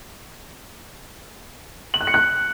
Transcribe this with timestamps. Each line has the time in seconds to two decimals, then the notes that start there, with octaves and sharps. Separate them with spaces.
1.94 F#7
2.01 F#6
2.07 C#7
2.14 F#6